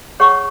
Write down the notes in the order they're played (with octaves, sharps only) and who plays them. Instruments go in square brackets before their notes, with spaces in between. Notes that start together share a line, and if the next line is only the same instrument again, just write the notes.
[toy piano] G#4 C#5 F#5 C#6